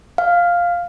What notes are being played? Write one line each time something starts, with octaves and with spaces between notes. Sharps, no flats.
F5